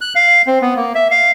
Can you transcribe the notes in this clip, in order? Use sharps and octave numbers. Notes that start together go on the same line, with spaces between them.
F#6
F5
C4
B3
A#3
E5
F5